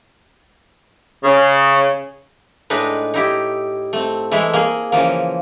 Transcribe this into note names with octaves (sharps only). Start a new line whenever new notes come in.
C#3
A2 G#3 D4 D#4 B4
D#4 E4 G4
A3 C4
E3 G#3 A3 E4
A#3 G#4
C#3 E3 F3 A#3